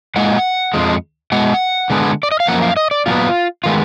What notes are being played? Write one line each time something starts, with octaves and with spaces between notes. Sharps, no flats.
A#2 G#3 F#5
F2 F3 G#3
B2 G#3 F#5
D3 G#3 B3
D5
D#5
F5
F#2 F3 A#3 F#5
F5
D#5
D5
A#2 F#3 B3 F4
D#3 G#3 B3 F4